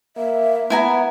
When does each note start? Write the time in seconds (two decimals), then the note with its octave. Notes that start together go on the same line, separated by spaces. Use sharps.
0.17 A#3 E5
0.70 B3 E4 G#5 A#5